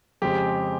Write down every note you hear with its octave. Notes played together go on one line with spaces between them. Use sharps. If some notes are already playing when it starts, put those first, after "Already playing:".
F2 C#3 G#3 C4 G4